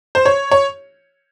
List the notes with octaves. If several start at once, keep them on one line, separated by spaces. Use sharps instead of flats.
C5
C#5
C#5